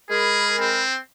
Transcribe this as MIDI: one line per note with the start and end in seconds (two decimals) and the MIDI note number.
0.10 0.82 56
0.10 0.56 68
0.10 0.82 70
0.10 0.82 83
0.59 0.98 60